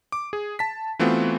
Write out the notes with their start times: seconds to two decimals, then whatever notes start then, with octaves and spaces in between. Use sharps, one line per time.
0.12 D6
0.33 G#4
0.59 A5 B6
0.99 E3 A3 B3 C4 F4 F#4